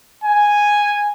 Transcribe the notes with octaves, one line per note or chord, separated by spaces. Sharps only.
G#5